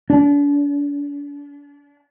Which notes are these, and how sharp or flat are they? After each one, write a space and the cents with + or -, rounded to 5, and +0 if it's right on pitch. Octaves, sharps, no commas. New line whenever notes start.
D4 -40